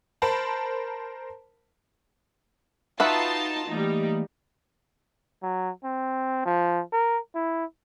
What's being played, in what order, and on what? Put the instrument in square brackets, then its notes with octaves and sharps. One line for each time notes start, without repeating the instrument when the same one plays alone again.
[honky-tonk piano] A#4 C5 A5 B5
[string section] D#4 F4 A5 [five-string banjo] F#4 B4 E5
[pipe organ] E3 A3 A#3 [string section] G3 D#4
[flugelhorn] F#3
C4
F3
A#4
E4